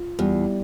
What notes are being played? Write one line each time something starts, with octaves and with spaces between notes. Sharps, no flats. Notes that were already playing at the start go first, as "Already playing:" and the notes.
Already playing: F4
E2 G3